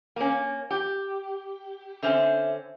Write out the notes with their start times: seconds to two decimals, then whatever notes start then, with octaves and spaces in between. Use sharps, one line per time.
0.16 A#3 C#4
0.71 G4
2.03 D3 C4 C#4 E5